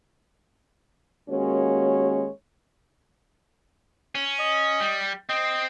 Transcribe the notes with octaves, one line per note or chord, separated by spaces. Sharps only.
D#2 G#3 A#3 C#4 F#4 C#5
C#4
D#5
G3
C4 D#5